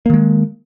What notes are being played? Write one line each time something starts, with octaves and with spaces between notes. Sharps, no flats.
D#3 G#3 A#3